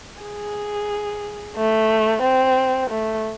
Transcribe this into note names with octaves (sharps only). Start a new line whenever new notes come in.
G#4
A3
C4
A3